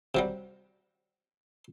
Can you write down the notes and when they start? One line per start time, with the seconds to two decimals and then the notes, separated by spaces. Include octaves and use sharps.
0.15 C3 F#3 G3